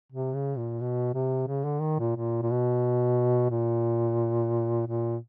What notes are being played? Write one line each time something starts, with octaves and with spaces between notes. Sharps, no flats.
C3
C#3
A#2
B2
C3
C#3
D3
D#3
A#2
A#2
A#2
B2
A#2
A#2